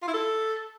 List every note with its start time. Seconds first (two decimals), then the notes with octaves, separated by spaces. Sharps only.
0.02 F4
0.08 E4
0.13 A4